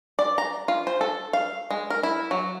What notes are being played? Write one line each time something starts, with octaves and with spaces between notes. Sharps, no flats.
D5
A#5
F4
C5
A4
F5
G#3
A#4
E4
F#3